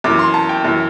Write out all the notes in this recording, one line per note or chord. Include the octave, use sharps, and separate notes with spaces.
F#2 E3 D6
C6
A5
G5
F#2 E3